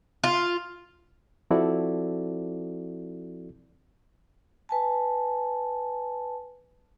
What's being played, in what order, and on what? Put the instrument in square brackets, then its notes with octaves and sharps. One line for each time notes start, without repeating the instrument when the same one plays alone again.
[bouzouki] F4
[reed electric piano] F3 C4 E4 F#4 A4 D5
[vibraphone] B4 G#5 A5